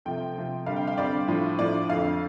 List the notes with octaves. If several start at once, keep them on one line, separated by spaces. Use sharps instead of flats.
C3 F3 A3 C4 G5
C3 F3 A3 C4
D3 G3 C4 F5
G5
F5
D3 G3 C4 D5
A2 F3 D4
A2 F3 D4 D5
F2 D3 F3 F5